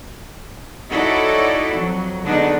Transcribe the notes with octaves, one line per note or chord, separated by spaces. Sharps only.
D#4 E4 F#4 A4 C#5 D5
F2 F#3
D3 F#3 G#3 B3 D4 D#4